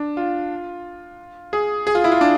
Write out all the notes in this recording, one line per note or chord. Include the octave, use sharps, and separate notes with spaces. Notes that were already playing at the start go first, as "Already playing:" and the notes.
Already playing: D4
F4
G#4
G#4
F4
E4
F4
D4